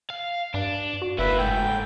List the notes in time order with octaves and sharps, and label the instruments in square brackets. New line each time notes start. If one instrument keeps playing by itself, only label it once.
[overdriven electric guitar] F5
[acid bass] G2 [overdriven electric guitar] D4
[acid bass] F#4
[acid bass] F#1 [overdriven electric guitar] A#3 E4 [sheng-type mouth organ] B4 E5
[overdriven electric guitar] G#2 A3 [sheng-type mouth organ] G5